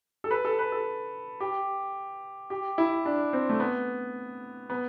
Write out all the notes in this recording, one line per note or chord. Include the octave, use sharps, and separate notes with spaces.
A4
B4
A4
B4
A4
G4
G4
E4
D4
C4
A3
B3
B3